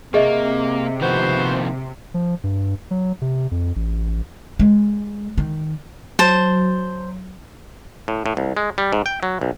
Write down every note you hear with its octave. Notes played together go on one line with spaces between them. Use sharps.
C3 A#3 G#4 D#5 E5
D#3 F3 A#3 B3 F#4 C5
F3
G2
F#3
C3
F2
A1
G#3
D#3
F#3 C5 A5
A2
A2
C2
G#3
G3
G#2
G5
F#3
B1